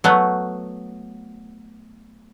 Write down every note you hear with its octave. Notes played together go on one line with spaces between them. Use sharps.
F#3 A3 B3